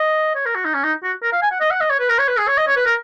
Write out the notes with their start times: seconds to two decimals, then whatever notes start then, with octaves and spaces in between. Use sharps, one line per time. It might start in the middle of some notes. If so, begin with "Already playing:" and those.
Already playing: D#5
0.35 C#5
0.46 A#4
0.55 F#4
0.65 D#4
0.74 C#4
0.84 D#4
1.03 F#4
1.23 A#4
1.32 F5
1.42 G#5
1.51 F#5
1.61 D#5
1.71 F#5
1.81 D#5
1.90 C#5
2.00 B4
2.09 A#4
2.19 C#5
2.28 B4
2.38 G#4
2.48 C#5
2.58 D#5
2.67 C#5
2.76 B4
2.86 A#4